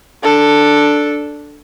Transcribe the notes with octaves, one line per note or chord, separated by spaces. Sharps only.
D4 A4